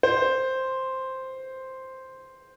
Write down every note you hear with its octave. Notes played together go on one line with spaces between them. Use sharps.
C5